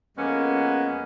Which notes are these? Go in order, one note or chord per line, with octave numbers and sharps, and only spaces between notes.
F2 G#3 A#3 B3 C#4